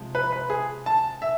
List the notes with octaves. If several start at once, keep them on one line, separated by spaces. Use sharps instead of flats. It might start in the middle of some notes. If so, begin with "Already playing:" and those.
Already playing: C3 F3 G#3
B4
B4
G#4
A5
E5